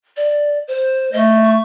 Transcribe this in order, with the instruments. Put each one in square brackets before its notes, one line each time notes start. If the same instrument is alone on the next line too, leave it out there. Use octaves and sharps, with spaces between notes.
[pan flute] D5
C5
[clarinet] A3 [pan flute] D#5
[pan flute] C#6